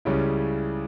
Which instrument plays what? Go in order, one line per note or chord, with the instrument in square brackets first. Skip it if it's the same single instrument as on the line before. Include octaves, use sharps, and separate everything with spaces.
[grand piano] C#2 C#3 G3 C#4 E4